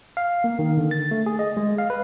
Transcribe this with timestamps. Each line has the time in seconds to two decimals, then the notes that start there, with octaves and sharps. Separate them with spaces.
0.17 F5
0.44 A#3
0.59 D#3
0.77 D3
0.91 A6
1.11 A3
1.26 G#4
1.39 D#5
1.57 G#3
1.78 F5
1.90 B4